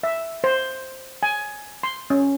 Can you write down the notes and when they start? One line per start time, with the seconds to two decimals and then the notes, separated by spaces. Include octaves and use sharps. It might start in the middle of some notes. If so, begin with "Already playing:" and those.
0.03 E5
0.44 C5
1.23 G#5
1.83 C6
2.10 C#4